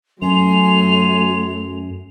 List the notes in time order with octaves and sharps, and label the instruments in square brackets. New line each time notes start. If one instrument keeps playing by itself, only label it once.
[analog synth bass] F#2 [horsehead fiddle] F#3 A3 [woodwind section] G#5 C6 [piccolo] F7